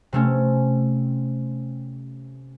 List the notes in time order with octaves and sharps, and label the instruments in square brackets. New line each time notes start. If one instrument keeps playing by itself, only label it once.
[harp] C3 A3 C#4